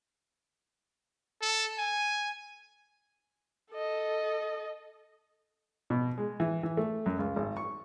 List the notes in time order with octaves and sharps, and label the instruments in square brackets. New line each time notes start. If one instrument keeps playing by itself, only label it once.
[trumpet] A4
G#5
[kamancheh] A4 D#5
[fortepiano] B2
G#3
E3
E3
A3
F#2
C#2
G#1
C#6